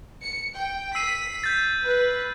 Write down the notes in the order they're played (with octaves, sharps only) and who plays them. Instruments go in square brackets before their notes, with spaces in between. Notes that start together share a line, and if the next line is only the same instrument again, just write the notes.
[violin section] C#7
G5
[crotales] E6 C7 D#7 [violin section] B6
[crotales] G6 A6
[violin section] B4